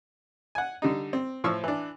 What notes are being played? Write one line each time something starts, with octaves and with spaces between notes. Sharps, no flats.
F#5 G#5
D3 G3 D#4
C4
A2 F3 C#6 E6 F6
E3 D4